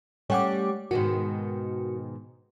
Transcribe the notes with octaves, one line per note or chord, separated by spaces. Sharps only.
G3 A3 C#4 C#5 F#5 D6
G#2 B2 D#3 F#4